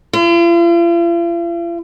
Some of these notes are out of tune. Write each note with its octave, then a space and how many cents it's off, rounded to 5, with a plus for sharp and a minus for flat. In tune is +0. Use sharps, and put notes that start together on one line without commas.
F4 -45